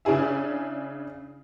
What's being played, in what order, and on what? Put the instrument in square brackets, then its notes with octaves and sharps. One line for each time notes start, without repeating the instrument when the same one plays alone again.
[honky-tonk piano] C#3 D4 E4 G#4 E5